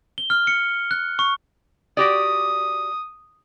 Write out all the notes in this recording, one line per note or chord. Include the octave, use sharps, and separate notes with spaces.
G7
F6
C#7
F#6
C#6
F#4 G4 D5 D#6